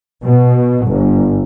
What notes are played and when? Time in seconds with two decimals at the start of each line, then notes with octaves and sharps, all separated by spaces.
0.24 B2
0.85 G1